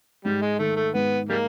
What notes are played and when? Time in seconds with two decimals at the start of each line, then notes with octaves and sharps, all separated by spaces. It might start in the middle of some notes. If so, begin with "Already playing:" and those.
0.25 G#2 G3
0.42 G#3
0.59 D#3 A3
0.77 A3
0.94 G#2 B3
1.29 G3 G#3 A#3